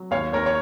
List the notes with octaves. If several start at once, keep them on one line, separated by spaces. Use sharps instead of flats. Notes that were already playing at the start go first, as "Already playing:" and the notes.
Already playing: F#3
D#2 C#5 F5
D#2 A#4 C#5
C#5